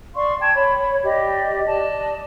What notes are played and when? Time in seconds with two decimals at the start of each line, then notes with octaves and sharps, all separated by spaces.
0.15 D5 F5 C6 C#6
0.40 G5 A5 G#6
0.55 C#5 B5
1.03 G4 D5 D#5
1.66 D5 D#5 A5